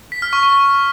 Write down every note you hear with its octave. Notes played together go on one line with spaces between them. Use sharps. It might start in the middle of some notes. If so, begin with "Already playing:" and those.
B6
F6
C#6
C#6